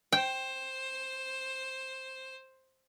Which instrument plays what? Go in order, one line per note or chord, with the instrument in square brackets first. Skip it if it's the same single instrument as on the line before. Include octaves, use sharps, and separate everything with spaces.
[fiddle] C5 [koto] G5